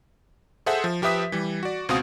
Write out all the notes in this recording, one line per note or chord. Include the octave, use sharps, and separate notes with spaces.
G#4 A4 C5 E5 F#5
F3
F3 G4 B4 E5 D#6 B6
E3 G3
F#4 D5
C#2 B2 C4 F#4 F5 D#6